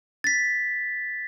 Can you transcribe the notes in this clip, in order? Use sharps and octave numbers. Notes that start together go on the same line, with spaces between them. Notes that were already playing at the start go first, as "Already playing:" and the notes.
A6 B6